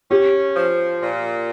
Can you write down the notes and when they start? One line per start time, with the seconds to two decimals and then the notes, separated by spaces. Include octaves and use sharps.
0.11 C#4 G4
0.56 F3
1.01 A#2